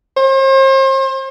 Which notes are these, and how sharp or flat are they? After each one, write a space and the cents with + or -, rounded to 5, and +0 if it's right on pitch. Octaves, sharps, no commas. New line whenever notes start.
C5 +40